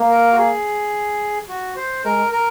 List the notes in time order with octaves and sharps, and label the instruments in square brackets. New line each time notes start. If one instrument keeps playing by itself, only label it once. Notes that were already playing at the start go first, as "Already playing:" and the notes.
Already playing: [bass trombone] A#3
[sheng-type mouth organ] A#4
F#4
G#4
F#4
C5
[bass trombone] G#3 [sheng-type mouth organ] A#4
[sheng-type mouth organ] A#4